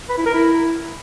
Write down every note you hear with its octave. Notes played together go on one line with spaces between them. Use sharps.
B4
E4
A#4
E4